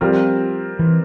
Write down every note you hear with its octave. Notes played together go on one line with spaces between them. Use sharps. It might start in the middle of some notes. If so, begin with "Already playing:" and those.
F3 G3 C4 F4 A#4
E3